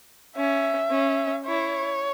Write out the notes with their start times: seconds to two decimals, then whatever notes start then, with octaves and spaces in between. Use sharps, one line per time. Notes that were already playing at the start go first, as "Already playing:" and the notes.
0.37 C#4 E5
0.91 C#4
1.45 E4 C#5